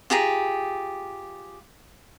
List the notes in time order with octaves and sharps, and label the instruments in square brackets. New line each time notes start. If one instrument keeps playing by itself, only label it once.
[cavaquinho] F4 G4 G#4 A#5